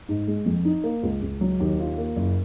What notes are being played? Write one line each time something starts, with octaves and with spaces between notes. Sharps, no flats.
G#2
G#3
F2
D#4
A#3
C#2
C#2
F#3
D#2
F4
A#3
F#1